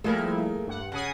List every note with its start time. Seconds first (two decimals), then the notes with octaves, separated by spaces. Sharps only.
0.04 F3 G3 A3 A#3 E4 G#4 A#4
0.67 G2 F#5
0.92 C#3 F#5 G#5 D#6